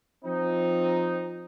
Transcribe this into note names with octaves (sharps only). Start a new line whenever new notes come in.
F3 C4 D#4